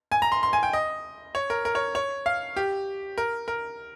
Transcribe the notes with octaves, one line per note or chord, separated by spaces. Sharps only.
G#5
A#5
C6
C6
G#5
G5
D#5
C#5
A#4
A#4
C#5
C#5
F5
G4
A#4
A#4